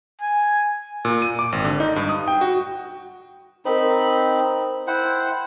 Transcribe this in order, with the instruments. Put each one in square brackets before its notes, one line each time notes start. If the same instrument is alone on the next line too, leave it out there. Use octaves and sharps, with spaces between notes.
[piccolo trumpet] G#5
[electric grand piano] A#2
D#7
D6
G#1
D3
D#4
G2
D#6
G5
F#4
[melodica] C4 D#4 B5 [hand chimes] A#4 C5
[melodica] E4 C5 F#5 [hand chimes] G5